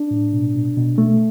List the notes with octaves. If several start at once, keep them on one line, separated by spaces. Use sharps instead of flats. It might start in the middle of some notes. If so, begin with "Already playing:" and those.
Already playing: D4
A2
B2
B2
B2
B2 A3